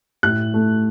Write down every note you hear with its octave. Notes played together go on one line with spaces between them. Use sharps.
A2 F#6
A3